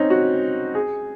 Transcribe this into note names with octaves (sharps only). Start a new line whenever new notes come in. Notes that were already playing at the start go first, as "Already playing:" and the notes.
Already playing: C4 C#4 D#4
F#4
G#4